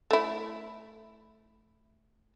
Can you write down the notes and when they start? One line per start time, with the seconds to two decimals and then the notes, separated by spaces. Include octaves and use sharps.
0.11 A3 E4